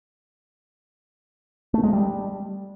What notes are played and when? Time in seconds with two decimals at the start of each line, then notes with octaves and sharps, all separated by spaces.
1.74 A3
1.83 G#3
1.93 G3